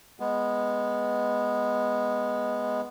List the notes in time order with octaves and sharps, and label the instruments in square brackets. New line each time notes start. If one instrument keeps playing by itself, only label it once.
[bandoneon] G#3 B3